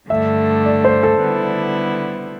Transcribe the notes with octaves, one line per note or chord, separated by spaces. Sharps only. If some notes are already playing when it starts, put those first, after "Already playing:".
G2 D3 A3 E5
D5
C5
A4
D3 G3 B3 E4